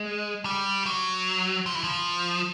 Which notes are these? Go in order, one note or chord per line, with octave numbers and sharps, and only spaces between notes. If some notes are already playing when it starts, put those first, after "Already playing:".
Already playing: G#3
G3
F#3
F3
E3
F3